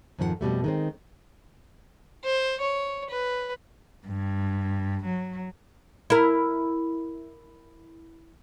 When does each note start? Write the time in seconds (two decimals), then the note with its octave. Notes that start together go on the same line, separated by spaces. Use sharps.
0.19 F2 G#2 D#3 F3 F4 F#5
0.41 F2 B2 G3 A3
0.64 D#3 G#3 C4
2.24 C5
2.61 C#5
3.09 B4
4.06 G2
5.05 F#3
6.10 E4 A#4